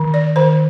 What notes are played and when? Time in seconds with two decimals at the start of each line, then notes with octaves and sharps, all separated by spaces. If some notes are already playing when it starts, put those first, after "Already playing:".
Already playing: D#3
0.14 D5
0.36 D#3 C5